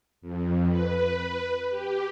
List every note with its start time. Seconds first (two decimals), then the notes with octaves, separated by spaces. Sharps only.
0.21 F2
0.69 B4
1.69 G4